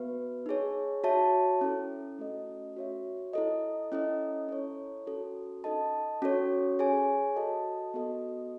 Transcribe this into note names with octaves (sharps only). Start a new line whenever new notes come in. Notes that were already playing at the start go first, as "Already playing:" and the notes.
Already playing: B3 F#4 B4 E5
D#4 G#4 C#5
F#4 C#5 E5 A5
C#4 E4 A4
A3 C#4 F#4 A4 D#5
F#4 C#5 E5
E4 A4 D#5
C#4 E4 A4 D#5
E4 A4 C#5
C#4 F#4 A4
D#4 A4 D#5 A5
C#4 F#4 A4 C#5
G#4 C#5 G#5
F#4 A4 D#5 F#5 A5
B3 F#4 A4 D#5